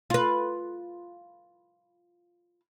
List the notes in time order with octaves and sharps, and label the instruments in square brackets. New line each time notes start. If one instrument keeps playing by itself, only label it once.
[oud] F4 B4